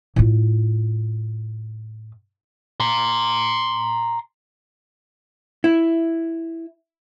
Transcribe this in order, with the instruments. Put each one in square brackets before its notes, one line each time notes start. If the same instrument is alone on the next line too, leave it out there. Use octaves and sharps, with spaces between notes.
[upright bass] A2 F4
[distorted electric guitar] A#5 C6
[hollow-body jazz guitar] E4